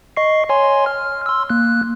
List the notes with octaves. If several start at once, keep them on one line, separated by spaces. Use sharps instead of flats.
D#5 C#6 C7
C#5 G#5 C6
F6
C6 E6
A#3 F#6